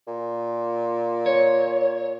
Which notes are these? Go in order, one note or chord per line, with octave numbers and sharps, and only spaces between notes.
A#2
C#5